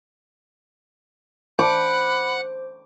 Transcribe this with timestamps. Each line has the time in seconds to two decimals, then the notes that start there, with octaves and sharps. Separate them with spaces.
1.59 C5 F#5 B5 D6 F#6